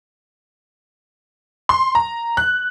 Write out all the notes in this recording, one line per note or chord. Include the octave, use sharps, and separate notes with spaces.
C6
A#5
F#6